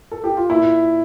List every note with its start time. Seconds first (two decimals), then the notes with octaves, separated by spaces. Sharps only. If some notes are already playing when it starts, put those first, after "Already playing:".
0.11 A4
0.24 G4
0.37 F4
0.50 A#2 E4